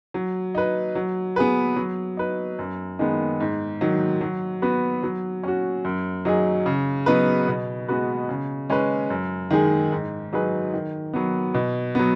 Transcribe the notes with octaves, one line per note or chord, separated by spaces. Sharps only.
F#3
D#4 B4
F#3
B3 G#4 B4
F#3
D#4 B4
F#2
D#3 G#3 B3
G#2
D#3 F#3
F#3
B3 F#4 B4
F#3
C#4 F#4
F#2
F#3 D#4 G#4
C#3
F#3 B3 D#4 B4
B2
G#3 B3 F#4 B4
C#3
G#3 C#4 B4
F#2
D#3 G#3 D#4 G#4
G#2
F#3 D#4 G#4 B4
D#3
F#3 B3
B2
F#3 B3